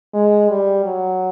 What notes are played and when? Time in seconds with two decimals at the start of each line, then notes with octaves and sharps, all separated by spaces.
0.14 G#3
0.49 G3
0.85 F#3